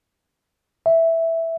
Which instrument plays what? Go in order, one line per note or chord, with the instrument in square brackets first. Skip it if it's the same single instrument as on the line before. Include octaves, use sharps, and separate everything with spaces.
[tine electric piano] E5